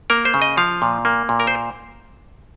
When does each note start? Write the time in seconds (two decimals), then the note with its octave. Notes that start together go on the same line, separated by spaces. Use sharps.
0.10 A#3 A#4
0.25 C5
0.34 C#3
0.42 D#5
0.57 F3 F5
0.82 A#2
1.05 A#3
1.29 A#2
1.40 A#4
1.47 C5